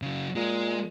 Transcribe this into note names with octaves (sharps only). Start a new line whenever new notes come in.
C#3 F#3
A#2 G#3